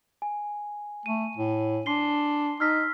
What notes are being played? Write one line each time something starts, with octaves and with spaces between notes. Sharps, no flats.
G#5
A3 D#7
A2
D4 C6 C7 G7
D#4 E6 F6 B6